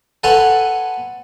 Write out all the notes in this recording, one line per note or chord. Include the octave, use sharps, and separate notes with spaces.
A4 B4 C#5 F#5 G#5 C6